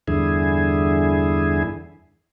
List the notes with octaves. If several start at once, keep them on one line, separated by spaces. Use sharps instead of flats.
E2 G2 D3 E4 G#4